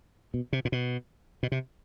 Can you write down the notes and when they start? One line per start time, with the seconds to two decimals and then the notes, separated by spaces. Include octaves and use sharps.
0.34 B2
0.53 C3
0.65 A#2
0.72 B2
1.43 B2
1.52 C3